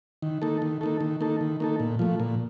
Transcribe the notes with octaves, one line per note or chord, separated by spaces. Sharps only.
D#3
A#3 D#4 A4
D#3
A#3 D#4 A4
D#3
A#3 D#4 A4
D#3
A#3 D#4 A4
A#2
F3 A3
A#2